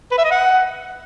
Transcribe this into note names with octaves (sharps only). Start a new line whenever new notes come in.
B4
E5
D#5
F#5